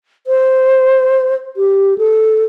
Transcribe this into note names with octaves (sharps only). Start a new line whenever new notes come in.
C5
G4
A4